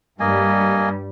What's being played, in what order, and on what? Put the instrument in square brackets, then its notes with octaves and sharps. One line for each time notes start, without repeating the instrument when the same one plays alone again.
[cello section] G2 G3 [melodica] A#3 D#5 G#5